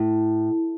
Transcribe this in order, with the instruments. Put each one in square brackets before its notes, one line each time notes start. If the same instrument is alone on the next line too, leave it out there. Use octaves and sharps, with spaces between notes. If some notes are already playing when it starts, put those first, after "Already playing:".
Already playing: [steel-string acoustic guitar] A2